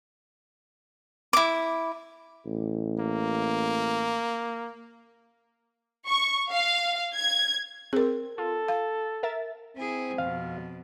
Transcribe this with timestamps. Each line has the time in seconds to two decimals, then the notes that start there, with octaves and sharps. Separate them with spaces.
1.33 E4 D6
2.46 A1
2.99 A#3
6.08 C#6
6.51 F5
7.15 G#6
7.93 C4 G#4 A#4
8.38 F4 A4
8.68 F5
9.23 A#4 E5 A6
9.77 C4 E4 G#4
10.18 F2 B2 F5